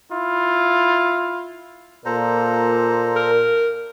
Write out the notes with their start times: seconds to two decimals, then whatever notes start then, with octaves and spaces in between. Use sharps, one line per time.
0.12 E4 F4
2.06 A#2 A4 C5 A#5
3.16 A#4